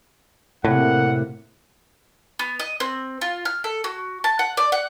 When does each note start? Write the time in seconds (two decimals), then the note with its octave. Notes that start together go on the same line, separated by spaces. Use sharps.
0.65 A2 C3 A#3 F#5
2.39 B3
2.59 D#5
2.80 C4
3.21 F4
3.45 F6
3.64 A4
3.84 F#4
4.24 A5
4.39 F#5
4.57 D5
4.72 F#5